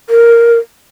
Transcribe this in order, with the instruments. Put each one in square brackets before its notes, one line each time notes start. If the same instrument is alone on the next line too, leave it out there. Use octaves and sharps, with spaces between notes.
[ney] A#4